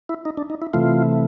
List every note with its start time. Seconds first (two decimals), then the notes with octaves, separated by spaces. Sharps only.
0.09 E4
0.25 D#4
0.37 D4
0.50 D#4
0.62 E4
0.73 C3 E3 A3 F4